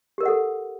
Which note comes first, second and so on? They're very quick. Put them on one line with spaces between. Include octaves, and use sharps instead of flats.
G4 A#4 D#5 F#5 A4